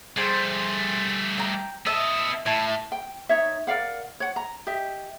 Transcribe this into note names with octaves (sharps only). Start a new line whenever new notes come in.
G3 A3 G#4 C5 G5
G5 A#5
B3 D#5 E5 A5
A2 E4 A5
G5
D#4 C#5 E5
A#4 D5 F5 F#5
C#5 F#5
A#5
G4 D#5 E5